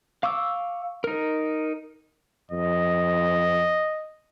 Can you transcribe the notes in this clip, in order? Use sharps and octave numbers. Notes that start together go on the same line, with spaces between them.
F5 C#6 D6 E6
D#4 A#4
F2 D#5